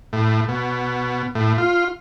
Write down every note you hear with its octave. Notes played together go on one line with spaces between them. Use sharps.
A2
B2
A2
F4